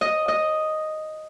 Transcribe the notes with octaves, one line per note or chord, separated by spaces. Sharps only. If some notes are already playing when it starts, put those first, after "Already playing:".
D#5
D#5